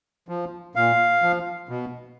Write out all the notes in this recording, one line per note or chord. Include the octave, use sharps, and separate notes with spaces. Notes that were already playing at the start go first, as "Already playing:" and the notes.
F3
A#2 F5
F3
B2